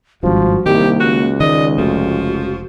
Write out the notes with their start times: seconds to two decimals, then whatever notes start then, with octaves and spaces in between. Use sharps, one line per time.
0.23 G#1 G2 F3 F#4
0.66 C2 D#3 A#3 G4
1.00 C#2 F#4
1.40 D#3 G#3 D5 D#5
1.78 F1 F3 A3 F#4